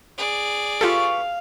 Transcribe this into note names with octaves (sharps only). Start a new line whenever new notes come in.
G#4 D5
F4 G4 A4 B4 F5 C#6